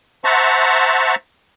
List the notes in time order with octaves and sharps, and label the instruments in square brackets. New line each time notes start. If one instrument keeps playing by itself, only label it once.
[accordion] C5 E5 F#5 A5 A#5 C#6